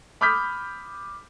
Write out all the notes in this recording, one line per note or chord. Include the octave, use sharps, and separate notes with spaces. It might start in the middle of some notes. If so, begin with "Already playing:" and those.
B5 D6 D#6 F6 G6 B6